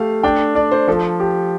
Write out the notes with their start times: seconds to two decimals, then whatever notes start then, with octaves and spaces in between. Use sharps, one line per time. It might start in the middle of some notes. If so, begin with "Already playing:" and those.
Already playing: A3 G4 F5
0.23 D4 G5
0.55 D4 D5
0.72 C5
0.88 F3 A4
1.20 G4